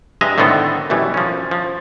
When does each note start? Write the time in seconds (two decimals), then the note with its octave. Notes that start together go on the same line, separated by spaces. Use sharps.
0.21 G2 G#3 D#5 E5 A#5
0.38 A2 D3 D#3 B3 C4 A4
0.90 F#2 B2 E3 G3
1.14 F3 C#4
1.51 F3